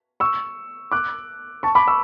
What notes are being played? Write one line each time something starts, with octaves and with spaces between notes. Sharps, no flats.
C#6 E6
D6 F#6
A5 C#6
B5 D6
C#6 E6